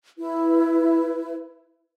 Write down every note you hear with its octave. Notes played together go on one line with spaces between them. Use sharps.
E4 B4